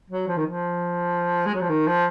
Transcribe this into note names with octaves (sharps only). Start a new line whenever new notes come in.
F#3
F3
D#3
F3
G#3
F#3
F3
D#3
F3